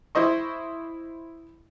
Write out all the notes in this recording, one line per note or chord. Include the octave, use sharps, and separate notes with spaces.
E4 C5 D#5 C#6